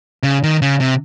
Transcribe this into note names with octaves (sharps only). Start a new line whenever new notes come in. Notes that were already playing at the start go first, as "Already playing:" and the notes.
C#3
D#3
C#3
C3